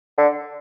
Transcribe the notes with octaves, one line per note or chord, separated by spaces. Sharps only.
D3